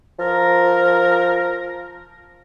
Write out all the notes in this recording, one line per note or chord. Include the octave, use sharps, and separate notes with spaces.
F3 A#4